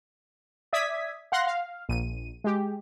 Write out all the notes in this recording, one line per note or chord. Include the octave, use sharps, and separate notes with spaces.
D5 E5 D#6 G#6 B6
F5 F#5 C6 F#6 A#6
F5
A#1 D#7
G#3 G4